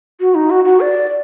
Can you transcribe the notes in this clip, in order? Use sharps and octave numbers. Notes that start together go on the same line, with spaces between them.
F#4
D#4
F#4
F#4
D5